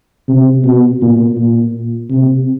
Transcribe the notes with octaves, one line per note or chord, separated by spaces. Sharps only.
C3
B2
A#2
A#2
C3